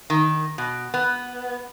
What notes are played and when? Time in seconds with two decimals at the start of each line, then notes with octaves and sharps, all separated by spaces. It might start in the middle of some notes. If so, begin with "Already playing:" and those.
0.10 D#3
0.58 B2
0.94 B3